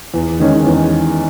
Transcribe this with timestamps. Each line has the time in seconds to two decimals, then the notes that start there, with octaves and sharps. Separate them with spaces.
0.14 E2
0.40 D#3 G#3 C#4
0.66 E2